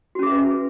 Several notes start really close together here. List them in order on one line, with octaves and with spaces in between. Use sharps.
F#4 C#4 G#4 E5 B4